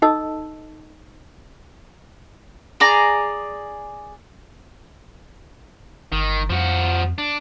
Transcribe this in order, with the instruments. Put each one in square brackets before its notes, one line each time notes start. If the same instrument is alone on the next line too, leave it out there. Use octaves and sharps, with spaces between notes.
[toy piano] D#4 A4 D#5 A5 E6
[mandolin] G#4 D5 A#5
[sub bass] G1 [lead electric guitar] D#3
[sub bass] F2 [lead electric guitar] F3 F#4
[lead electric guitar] D4